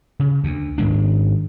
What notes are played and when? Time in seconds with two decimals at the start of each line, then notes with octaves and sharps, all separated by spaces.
0.20 C#3
0.44 D2
0.78 G#2 D#3 G#3 D4